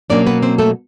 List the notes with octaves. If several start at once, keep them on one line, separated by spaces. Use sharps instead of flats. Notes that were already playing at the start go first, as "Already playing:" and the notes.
B2 F#3 A#3 C#4 D4 D5
B3 B4
C4 C5
A3 A4